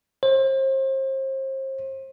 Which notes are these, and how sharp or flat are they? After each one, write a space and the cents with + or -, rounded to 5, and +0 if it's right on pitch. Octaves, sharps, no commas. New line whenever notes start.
C5 +35